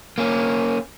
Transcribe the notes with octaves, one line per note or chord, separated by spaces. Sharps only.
A#3 C#4